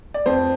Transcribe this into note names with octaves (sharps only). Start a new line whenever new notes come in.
D5
F2 C5